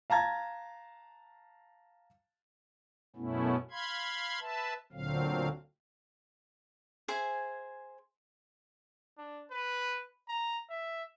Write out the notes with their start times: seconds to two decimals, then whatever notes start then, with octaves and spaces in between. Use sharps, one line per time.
0.10 F5 A5 A#5 G#6 A6
3.16 F#2 B2 A3 B3 C#4 E4
3.71 F5 B5 C6 G#6
4.40 B4 E5 A5
4.93 D2 A#2 D3 F#3 C4 F5
7.08 G#4 C5 E5 G#5
9.18 D4
9.51 B4
10.28 A#5
10.70 E5